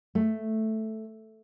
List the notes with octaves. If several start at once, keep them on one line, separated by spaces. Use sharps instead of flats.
A3